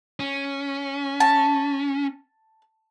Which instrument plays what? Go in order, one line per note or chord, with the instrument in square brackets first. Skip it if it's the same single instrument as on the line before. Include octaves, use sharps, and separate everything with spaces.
[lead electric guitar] C#4
[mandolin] A5